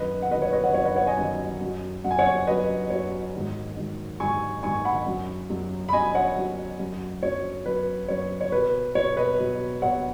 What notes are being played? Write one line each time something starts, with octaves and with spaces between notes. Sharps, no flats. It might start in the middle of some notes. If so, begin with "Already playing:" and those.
Already playing: F#2 D#3 F#3 B4 D#5
F#5
F#2 D#3 F#3 B4 D#5
C#5
B4 D#5
C#5 F#5
F#2 D#3 F#3 C#5 F#5
B4 D#5
C#5 F#5
D#5 G#5
F#2 D#3 F#3
F#2 F#3
F#2 F#3 F#5
G#5
C#5 F#5
F#2 F#3 B4 D#5
F#2 F#3 C#5
G#2 D#3 F#3
G#2 D#3 F#3
G#2 D#3 F#3 G#5 C#6
G#2 D#3 F#3 G#5 C#6
F#5 B5
F#2 F#3
F#2 F#3
B5
F#2 F#3 D#5 G#5
C#5 F#5
F#2 F#3
F#2 F#3
F#2 F#3 C#5
F#2 F#3 B4
F#2 F#3 C#5
C#5
B2 F#3 B4
B2 F#3 C#5
B4 D#5
B2 F#3
B2 F#3 C#5 F#5